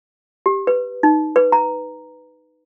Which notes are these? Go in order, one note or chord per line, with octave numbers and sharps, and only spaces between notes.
G4
B4
D#4
B4
A#5